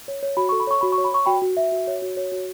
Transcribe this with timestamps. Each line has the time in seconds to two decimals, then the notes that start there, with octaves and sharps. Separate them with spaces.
0.08 C#5
0.23 C#5
0.37 F#4 B5
0.49 A4 C#6
0.60 B5
0.67 C#5 C#6
0.81 F#4 B5
0.92 C#6
0.98 C#5
1.04 B5
1.12 C#5 C#6
1.26 F#4 G5 B5
1.42 F#4
1.57 F#4 E5
1.72 F#4
1.87 C#5
2.02 F#4
2.17 C#5
2.32 F#4